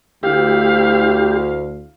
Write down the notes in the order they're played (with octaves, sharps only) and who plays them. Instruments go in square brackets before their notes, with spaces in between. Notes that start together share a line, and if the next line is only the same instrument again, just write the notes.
[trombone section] D2 [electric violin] E4 F5 [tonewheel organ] G4